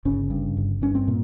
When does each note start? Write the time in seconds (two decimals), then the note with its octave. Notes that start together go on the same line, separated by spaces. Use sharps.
0.05 G1 C#3 C#4
0.30 G2
0.57 G1
0.82 G2 C#4
0.95 C4
1.08 A#2 A#3